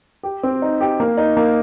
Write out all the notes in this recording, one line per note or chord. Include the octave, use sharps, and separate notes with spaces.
G4
C4
D#4
G4
A#3
D#4
A#3